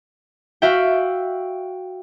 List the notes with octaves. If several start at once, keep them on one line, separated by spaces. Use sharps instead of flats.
F#4 E5 F5 G5